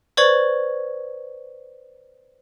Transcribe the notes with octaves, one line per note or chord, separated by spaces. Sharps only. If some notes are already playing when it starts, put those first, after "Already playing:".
B4 C5 D5 C#6 G#6 F#7